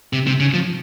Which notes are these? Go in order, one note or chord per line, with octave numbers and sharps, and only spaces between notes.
C3
C3
C#3
F3